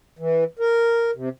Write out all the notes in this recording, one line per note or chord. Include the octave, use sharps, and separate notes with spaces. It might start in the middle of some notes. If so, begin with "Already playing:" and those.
E3
A#4
C3